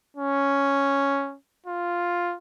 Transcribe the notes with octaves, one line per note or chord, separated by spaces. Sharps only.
C#4
F4